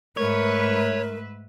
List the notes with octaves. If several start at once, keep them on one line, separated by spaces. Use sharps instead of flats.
G#2 A3 A#4 B4 C#5 E5